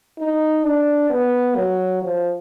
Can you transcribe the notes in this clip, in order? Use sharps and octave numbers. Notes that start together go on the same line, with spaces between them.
D#4
D4
B3
F#3
F3